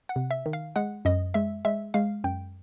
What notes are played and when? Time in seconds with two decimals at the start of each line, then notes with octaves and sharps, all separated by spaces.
0.09 F#5
0.16 C3
0.31 E5
0.46 D#3
0.53 F5
0.76 G#3 F#5
1.05 F#2 D#5
1.34 G#3 E5
1.65 G#3 E5
1.94 G#3 F5
2.24 F#2 G5